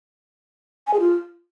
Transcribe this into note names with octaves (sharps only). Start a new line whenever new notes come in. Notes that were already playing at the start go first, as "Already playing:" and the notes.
G#5
G#4
F4